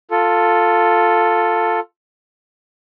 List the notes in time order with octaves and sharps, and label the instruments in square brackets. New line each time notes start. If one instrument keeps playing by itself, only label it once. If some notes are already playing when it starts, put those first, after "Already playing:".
[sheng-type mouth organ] F4 A4